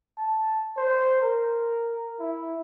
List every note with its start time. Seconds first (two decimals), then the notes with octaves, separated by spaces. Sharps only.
0.18 A5
0.77 C5
1.21 A#4
2.20 E4